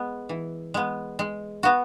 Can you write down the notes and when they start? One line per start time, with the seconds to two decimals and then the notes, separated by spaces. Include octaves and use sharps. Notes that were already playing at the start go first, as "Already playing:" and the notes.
Already playing: G#3 B3
0.29 E3
0.74 G#3 B3
1.19 G#3
1.63 B3 F#4